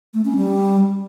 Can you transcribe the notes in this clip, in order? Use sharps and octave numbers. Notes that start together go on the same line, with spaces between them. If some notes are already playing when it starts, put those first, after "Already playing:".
A3
C#4
G3